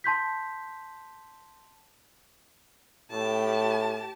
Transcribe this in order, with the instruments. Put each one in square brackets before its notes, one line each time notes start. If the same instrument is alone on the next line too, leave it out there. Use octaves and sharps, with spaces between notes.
[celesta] A5 C6 G6 B6
[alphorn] A2 [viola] G4 A5